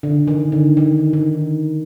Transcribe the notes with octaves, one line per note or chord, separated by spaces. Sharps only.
D3
D#3
D3
D#3
D#3